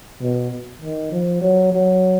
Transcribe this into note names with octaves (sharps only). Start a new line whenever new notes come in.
B2
D#3
F3
F#3
F#3